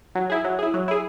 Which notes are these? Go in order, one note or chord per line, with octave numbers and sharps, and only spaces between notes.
F#3
E4 G#4
F#3
E4 G#4
F#3
E4 G#4